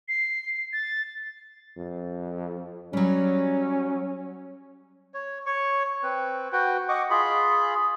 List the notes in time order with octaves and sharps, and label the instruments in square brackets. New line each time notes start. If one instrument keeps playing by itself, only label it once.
[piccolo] C7
A6
[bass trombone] F2
[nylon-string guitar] F#3 G3 [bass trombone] C#4
[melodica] C#5
C#5 C#6
C4 B4
F#4 B4 G5
D#5 F#5 C#6 D6
F4 G#4 B5